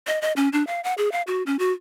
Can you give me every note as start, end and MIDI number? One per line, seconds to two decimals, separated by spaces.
0.07 0.19 75
0.22 0.32 75
0.36 0.49 61
0.53 0.65 62
0.67 0.81 77
0.84 0.94 78
0.98 1.12 68
1.12 1.22 77
1.27 1.43 66
1.46 1.57 61
1.59 1.72 66